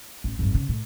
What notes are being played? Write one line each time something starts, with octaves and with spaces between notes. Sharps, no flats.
A1
G#1 F#2
C#3
A2